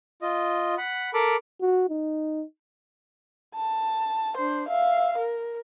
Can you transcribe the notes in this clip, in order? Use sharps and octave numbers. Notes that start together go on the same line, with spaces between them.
F4 D#5
F#5 B5
A4 A#4 B5 D6
F#4
D#4
A5
D4 C5
E5 F5
A#4